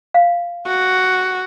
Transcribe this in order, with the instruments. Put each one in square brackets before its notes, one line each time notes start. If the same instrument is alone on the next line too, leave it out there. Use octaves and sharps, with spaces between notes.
[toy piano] F5
[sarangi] F#4